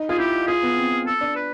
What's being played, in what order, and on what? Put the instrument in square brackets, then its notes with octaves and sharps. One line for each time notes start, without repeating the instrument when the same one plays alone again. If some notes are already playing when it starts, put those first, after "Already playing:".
Already playing: [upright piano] D#4
[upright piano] F4 [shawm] G#4
[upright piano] E4 [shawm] G4
[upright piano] F4 [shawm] G#4
[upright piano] B3
C4
[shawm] A4
[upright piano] D4
[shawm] B4